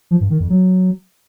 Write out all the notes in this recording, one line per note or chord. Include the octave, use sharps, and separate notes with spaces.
F3
G2
D#3
F2
F#3